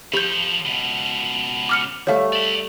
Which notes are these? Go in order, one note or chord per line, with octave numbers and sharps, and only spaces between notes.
F3 G4 A4 B5 G6
C#2 B2
D6 F6 C#7
G3 A3 C#5 F5
D5 E5